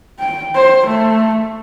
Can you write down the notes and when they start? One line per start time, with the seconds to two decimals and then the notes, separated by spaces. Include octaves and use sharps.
0.19 G5
0.55 C5
0.86 A3